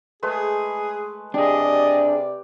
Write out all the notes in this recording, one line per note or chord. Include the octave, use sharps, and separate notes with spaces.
G#3 A3 G#4 B4
C3 D4 G4 G#4 D5 D#5